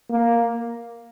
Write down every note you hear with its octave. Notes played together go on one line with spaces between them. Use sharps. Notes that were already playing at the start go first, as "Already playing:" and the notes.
A#3